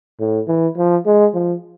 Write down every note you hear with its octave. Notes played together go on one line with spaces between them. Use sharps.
A2
E3
F3
G#3
F3